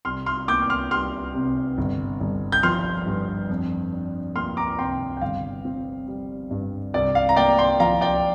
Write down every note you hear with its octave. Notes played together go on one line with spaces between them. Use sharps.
C2 C6 F6
C6 F6
A#3 D6 G6
C6 F6
G3 C6 F6
C3
G1
G1
G6
F3 C6 F6
G2
F2
D4
A#3 C6 F6
A#5 D6
C3 G5 C6
G5
G1 F5
C4
G3
G2
C2 D5
F5
A#5
A#3 D5 G5
G5 C6
F3 F5 A#5
D5 G5